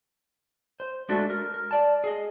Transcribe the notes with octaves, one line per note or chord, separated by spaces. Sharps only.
C5
G#3 A3 D4 F#4 A4
A#4
A#4
D5 A5
G#4 D#5